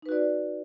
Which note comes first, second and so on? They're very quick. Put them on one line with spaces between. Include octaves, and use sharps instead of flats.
D#4 B4 F#4 D5